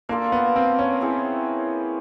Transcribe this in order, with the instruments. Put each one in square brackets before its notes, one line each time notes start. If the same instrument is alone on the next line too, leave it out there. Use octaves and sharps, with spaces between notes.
[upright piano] A#3 [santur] D4 F4 A4
[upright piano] B3
C4
C#4
[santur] C4 E4 G#4 C#5